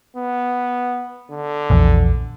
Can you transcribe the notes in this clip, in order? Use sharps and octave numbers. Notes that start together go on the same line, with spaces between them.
B3
D3
A#1 E2